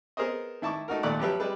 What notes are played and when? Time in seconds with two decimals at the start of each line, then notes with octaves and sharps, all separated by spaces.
0.17 B3 G#4 A#4 C5 D#5
0.62 D#3 E4 A5 C#6 D6
0.88 A3 D#4 F#4 A#4
1.03 D#2 A#2 A3 D5 D6 F#6
1.19 F3 F#3 G4 B4 E5
1.40 G3 G#3 B4